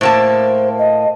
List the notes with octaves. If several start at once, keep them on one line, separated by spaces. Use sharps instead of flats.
A2 A#3 C5 A5
D#5